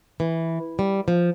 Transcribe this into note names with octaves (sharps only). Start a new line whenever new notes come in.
E3
G3
F3